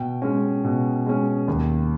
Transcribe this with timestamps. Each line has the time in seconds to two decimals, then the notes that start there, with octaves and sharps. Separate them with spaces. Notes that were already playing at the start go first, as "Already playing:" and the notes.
Already playing: B2 G5
0.22 G#3 C#4
0.64 B2
1.06 G#3 C#4
1.48 D#2